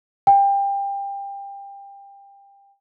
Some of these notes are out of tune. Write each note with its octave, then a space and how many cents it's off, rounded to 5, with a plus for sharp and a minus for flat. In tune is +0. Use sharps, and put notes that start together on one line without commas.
G5 +25